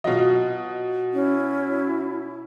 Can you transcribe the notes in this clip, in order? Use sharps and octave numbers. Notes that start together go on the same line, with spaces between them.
B2 F#3 F4 D#5
C#4 E4